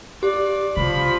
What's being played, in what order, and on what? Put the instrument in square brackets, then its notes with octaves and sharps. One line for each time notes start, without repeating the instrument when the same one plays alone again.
[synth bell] G4 [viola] D5
[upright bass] C#3 [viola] F3 B5